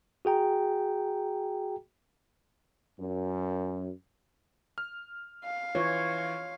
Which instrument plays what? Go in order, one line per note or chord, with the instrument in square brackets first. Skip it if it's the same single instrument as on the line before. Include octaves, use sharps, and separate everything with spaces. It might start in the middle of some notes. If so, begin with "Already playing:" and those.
[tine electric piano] F#4 G#4 G5 A#5
[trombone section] F#2
[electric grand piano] F6
[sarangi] F5
[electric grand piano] E3 [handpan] F4 C#5